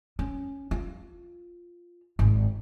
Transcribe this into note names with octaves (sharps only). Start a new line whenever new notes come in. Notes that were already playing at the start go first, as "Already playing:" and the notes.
C#4
F4
G#1